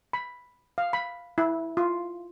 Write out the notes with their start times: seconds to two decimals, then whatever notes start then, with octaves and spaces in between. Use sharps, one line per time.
0.13 B5
0.78 F5
0.93 B5
1.38 E4
1.77 F4